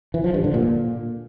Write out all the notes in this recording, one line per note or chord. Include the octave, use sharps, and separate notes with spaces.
E3
F3
G2
D3
A#2